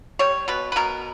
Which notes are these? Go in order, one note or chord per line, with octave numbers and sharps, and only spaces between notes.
G3 C#5
B2 B4
B4
B2 A#4